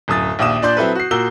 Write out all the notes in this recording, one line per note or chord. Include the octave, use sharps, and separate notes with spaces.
D1 F#2 D#6 A6
A#1 D#2 E5 D6 D#6 E7
A#2 D4 D5 C6 G6
F#3 C4 E4 A4 B4
F#4 C7
A#2 F#4 A#4 E6 G7